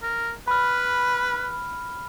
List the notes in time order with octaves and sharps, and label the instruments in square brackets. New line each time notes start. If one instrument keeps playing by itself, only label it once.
[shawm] A#4
[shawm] B4 [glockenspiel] B5 F6